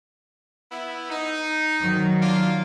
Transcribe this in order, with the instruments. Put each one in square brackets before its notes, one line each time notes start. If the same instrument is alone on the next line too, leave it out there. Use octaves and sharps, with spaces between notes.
[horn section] B3 E4
D#4
[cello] D#3 F#3
[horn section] A#3 D4 F4